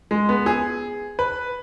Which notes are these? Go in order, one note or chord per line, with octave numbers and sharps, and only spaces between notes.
G#3
B3
G#4
B4